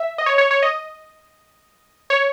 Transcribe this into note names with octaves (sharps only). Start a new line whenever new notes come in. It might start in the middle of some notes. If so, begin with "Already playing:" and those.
Already playing: E5
D#5
C#5
C#5
C#5
D#5
C#5